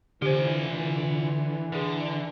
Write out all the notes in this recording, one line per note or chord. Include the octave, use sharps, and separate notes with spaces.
D3 E3 F4 G4 C5 G#5
D3 G#4 B4